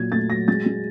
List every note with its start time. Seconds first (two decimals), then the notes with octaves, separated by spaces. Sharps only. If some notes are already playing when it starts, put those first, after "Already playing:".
Already playing: A#2 F#3 G#6
0.12 A3 A6
0.30 F#3 A#6
0.48 G#3 A6
0.66 G#3